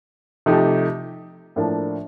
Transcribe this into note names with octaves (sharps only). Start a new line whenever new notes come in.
C3 F3 A3 D#4 G4
A2 F3 A#3 D4